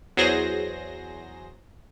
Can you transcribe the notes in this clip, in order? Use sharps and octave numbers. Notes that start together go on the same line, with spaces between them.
E2 F#3 G#4 C5 A#6